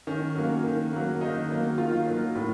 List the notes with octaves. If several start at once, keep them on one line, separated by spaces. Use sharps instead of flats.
D#3 C#4
F#3 A#3
D#3
F#3 A#3
D#3 D#4
F#3 A#3
D#3 F4
F#3 A#3
A2